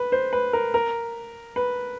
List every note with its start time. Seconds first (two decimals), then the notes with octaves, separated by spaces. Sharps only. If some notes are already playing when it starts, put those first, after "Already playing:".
Already playing: B4
0.12 C5
0.33 B4
0.53 A#4
0.74 A#4
1.56 B4